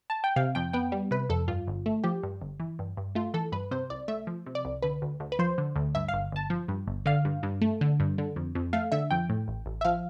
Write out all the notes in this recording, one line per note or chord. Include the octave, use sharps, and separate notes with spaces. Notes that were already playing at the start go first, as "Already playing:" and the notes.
A5
G5
C3 F5
F2 G5
B3 G5
G3
C3 B4
F2 A4
G2 F4
G1
A3
F3 G4
G2
G1
E3
G2
G2
A3 F4
E3 A4
G2 B4
C3 C5
C2 D5
A3 E5
F3
C3
D5
C2
D3 B4
D2
D2
B4
F3 C5
D3
D2
G2 E5
F5
G1
G1 A5
F3
G2
G1
D3 F5
G2
G2
A3
D3
G2
D3
F2
F2
A3 F5
D3 E5
F2 G5
A2
A1
A1
E5
F3 F5